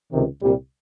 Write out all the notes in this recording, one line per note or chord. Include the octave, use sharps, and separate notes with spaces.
C#2 C3 D#3
C2 A#2 G3